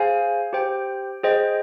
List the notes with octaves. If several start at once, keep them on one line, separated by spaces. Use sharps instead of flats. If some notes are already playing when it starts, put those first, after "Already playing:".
Already playing: G#4 C5 F5 G#5
G4 C5 G5
G#4 C5 D#5 G5